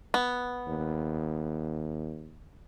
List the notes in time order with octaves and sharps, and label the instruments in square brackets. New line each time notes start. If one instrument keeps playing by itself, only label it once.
[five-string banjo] B3
[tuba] D#2